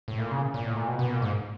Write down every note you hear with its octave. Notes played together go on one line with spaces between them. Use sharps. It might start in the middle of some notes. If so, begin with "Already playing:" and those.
A2
A#2
C#3
A#2
A2
A#2
B2
B2
A#2
G#2